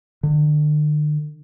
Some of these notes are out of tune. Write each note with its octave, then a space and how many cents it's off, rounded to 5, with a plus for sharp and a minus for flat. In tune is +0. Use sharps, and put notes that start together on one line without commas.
D3 +40